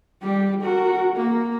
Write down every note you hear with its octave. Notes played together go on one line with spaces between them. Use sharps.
G3 G4
F#4 A#4
A#3